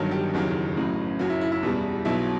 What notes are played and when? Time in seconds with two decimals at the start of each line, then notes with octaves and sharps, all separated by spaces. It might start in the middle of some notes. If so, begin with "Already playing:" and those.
Already playing: G1 G2 D#3 F#3
0.11 G4
0.34 F#1 E2 D#3 F#3
0.77 A1 A2 F#3
1.19 F#1 F#2 F#3 F#4
1.30 E4
1.41 E4
1.52 E4
1.63 E2 B2 G3
2.05 B1 B2 F#3 E4